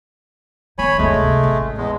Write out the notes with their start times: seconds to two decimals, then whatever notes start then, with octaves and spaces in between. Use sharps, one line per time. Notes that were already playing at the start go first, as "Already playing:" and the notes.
0.78 D#3 B3 C#5 G#5 B5
0.98 G1 D2 G#3 A3
1.14 C3
1.43 A1
1.77 E2 G#3